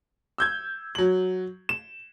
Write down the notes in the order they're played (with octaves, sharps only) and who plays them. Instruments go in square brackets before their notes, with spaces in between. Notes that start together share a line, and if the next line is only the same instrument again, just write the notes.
[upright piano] E6 G6 G#6
F#3 F#7
E7